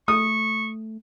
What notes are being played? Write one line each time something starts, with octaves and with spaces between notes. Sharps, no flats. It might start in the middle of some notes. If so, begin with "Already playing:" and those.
A3 C#6 D#6